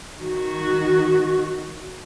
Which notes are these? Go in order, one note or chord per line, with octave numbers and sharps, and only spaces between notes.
D#3 F#4